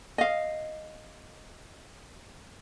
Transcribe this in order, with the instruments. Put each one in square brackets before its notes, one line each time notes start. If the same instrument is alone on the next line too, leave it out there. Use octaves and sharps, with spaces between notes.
[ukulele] D#5 F5